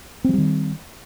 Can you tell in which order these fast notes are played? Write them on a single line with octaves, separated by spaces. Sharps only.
C4 F#3 G3 D#3